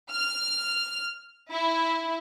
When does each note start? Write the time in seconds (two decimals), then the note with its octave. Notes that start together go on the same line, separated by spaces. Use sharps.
0.11 F6
1.51 E4